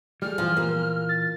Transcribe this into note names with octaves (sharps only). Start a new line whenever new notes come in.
G3 A3 G#4 F6
A#2 E3 F3 F4
A#3 F4
A6